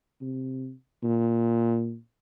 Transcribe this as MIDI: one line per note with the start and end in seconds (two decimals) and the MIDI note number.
0.21 0.72 48
1.03 1.96 46